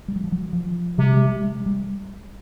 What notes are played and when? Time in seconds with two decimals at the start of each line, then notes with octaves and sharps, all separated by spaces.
0.08 G3
0.16 F#3
0.24 F3
0.32 F#3
0.53 F3
0.98 C3 G3
1.14 G#3
1.29 G3
1.44 G#3
1.66 G3